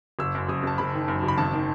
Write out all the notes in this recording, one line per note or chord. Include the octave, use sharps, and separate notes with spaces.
F#1 E6
F#2
F#1 D#6
F#1 A5
F#1 B5
D#3
F#2
F#1
B5
G#1 A5
D#3